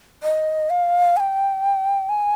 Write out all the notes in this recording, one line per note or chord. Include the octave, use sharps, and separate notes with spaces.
D#5
F5
G#5
G5
G#5